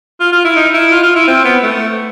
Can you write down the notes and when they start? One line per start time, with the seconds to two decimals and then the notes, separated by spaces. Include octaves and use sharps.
0.20 F4
0.33 F4
0.45 E4
0.56 D#4
0.74 E4
0.91 F4
1.03 F4
1.16 E4
1.28 C4
1.45 B3
1.63 A3